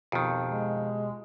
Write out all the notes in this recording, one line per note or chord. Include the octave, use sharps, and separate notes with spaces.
F2 B2 D#3 F4 G4
G#3